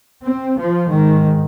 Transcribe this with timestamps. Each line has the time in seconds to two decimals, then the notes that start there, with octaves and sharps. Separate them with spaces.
0.22 C4
0.57 F3
0.90 G#2 D#3